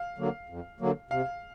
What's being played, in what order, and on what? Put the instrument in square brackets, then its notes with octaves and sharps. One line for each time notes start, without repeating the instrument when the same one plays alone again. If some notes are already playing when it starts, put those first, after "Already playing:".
Already playing: [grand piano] F5
[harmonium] D3 F#3 A#3
F2
D3 F#3 A#3
[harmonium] C3 [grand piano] F5